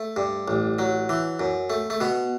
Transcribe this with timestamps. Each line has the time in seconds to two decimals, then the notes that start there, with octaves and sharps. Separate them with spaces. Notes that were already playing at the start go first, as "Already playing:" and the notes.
Already playing: A3
0.16 G2
0.48 A1
0.79 F#3
1.09 E3
1.40 F#2
1.70 A3
1.90 A3
2.01 B2 B3